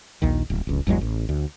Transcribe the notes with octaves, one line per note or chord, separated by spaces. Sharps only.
A#1 D#2 D#3
D1
D1 C#2
G1 E2 F#3 G#3
A1
D2